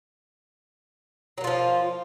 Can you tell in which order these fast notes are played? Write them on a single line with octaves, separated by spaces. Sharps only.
F#3 A#3 F4 F3